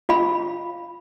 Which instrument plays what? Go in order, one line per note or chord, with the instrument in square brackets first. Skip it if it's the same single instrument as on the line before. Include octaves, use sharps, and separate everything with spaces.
[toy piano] F4 F5 B5